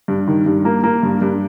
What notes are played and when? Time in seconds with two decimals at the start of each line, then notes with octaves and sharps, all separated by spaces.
0.08 G2
0.27 D#3
0.46 G2
0.65 A#3
0.84 A#3
1.03 G2
1.22 G2